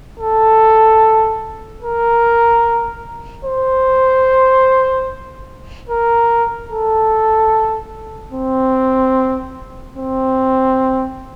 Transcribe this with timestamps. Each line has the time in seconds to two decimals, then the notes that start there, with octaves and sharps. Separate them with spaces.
0.19 A4
1.82 A#4
3.45 C5
5.89 A#4
6.71 A4
8.33 C4
9.96 C4